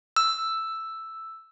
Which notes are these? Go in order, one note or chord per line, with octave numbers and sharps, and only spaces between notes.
E6